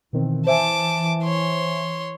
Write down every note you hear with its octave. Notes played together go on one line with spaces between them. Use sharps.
B2 D#3 E3 C4
C5 E5 G#5 A5 D6
C#5 C6